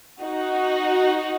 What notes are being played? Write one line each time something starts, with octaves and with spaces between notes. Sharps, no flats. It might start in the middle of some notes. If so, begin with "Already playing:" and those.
D#4 F#4